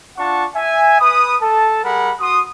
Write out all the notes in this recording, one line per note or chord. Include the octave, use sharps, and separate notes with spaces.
D4 F4 F#5 A5 C#6
E5 G#5
B4 B5 D#6
A4 A5
G3 G#4 A#4 F#5 B5
F#4 C6 D#6